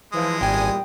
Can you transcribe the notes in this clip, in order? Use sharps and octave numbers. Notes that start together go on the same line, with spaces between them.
E3 F3 G#3 D#6
G#1 E2 A#2 G3 G5 G#5